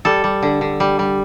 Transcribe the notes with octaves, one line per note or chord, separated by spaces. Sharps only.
G3 A4
G3
D3
D3
G3
G3